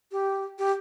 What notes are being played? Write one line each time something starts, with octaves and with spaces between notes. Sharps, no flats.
G4
G4